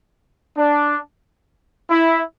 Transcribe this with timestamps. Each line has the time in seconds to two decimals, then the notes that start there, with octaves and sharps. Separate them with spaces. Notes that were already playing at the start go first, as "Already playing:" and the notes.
0.57 D4
1.90 E4